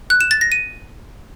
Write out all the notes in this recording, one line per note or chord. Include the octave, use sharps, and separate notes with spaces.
F#6
E7
A6
A#6
D#7